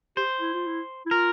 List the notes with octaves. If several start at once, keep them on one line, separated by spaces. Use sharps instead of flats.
G4 C5
E4
F4
E4
E4
F4 A#4